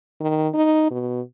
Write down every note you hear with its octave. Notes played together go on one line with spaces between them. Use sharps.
D#3
D#4
B2